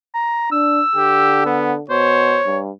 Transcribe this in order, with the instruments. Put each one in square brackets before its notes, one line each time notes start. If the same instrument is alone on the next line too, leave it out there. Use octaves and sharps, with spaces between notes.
[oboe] A#5
[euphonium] D4 [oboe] E6
[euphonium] D3 [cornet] G4
[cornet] B3
[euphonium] B2 [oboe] C5 [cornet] C#5
[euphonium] G2